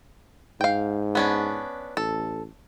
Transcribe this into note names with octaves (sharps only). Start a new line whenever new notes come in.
G#2 F5 G5
B3 C#4 D4
A1 A4